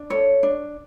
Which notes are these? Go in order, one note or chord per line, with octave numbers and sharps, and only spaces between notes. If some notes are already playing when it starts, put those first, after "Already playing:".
Already playing: D4
A4 C#5
D4